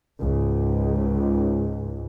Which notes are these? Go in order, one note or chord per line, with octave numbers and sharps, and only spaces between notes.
C#2 G#2